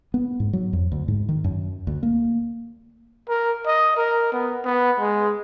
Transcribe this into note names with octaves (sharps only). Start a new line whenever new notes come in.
B3
G#2
F#3
F2
D2
G#2
D#3
F#2
D2
A#3
A#4
D#5
A#4
B3
B3
G#3